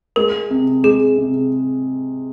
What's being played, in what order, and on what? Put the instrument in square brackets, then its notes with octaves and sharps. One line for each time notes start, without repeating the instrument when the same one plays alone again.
[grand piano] G#3 [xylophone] A#4
[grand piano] C3
[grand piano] G#3 [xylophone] G#4
[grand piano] C3